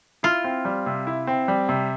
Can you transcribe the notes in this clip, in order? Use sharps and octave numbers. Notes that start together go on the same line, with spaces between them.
E4 F4
C4
G3
C3
E4
C4
G3
C3